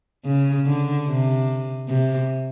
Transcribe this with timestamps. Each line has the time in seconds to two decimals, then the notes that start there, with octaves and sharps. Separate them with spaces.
0.25 C#3
0.66 D3
1.07 C3
1.88 C3